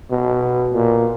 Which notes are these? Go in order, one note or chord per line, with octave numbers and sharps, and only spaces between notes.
B2
A#2